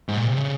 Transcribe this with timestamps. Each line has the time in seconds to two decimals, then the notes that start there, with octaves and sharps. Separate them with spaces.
0.08 G#2
0.17 A#2
0.27 C3
0.37 C#3